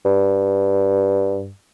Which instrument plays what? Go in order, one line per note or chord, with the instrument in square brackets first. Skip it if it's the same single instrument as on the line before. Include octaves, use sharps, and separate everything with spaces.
[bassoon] G2